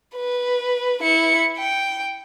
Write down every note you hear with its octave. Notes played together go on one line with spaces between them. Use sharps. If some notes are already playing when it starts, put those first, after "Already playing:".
B4
E4 C#7
G5